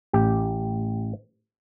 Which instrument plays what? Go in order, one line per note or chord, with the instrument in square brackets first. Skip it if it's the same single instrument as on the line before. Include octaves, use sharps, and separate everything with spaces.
[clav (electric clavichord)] A1 G4